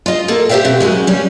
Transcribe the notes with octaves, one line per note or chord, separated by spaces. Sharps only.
F4 D#5
A#3 A4
G4 C5 D5 E5 F5 G5
B2 C4
F#2 G#3 F#4
G3 C#4